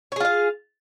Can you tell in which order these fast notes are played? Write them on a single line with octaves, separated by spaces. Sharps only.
C#5 G#4 F4 F5